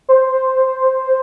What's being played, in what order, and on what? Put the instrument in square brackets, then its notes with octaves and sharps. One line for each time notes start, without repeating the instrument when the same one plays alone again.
[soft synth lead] C5